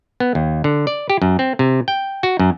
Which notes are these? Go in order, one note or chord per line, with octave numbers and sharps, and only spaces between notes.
B3
D#2
D3
D5
G4
F#2
C4
C3
G5
F#4
F#2